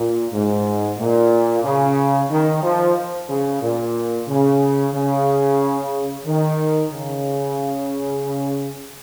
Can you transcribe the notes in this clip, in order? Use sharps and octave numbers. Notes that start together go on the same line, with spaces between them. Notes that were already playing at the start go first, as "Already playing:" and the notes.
Already playing: A#2
G#2
A#2
C#3
D#3
F3
C#3
A#2
C#3
C#3
D#3
C#3